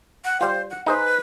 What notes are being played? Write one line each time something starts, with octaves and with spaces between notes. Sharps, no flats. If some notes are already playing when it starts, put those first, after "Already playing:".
F#5
G3 F4 C5
F#5
D#4 G#4 B4 C5